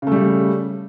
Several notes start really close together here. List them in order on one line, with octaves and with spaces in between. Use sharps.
C#3 A3 G3